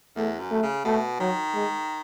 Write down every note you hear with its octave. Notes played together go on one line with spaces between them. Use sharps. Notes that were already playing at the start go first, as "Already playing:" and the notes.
E2 A3
F#2
A3
C#3
B2 A3
D#3 F#3
G#3